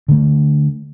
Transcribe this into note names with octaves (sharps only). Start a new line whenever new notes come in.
D3 A3